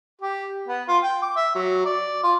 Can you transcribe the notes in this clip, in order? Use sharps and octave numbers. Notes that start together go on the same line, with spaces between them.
G4
B3
F4
G5
D6
E5
F#3
D5
F4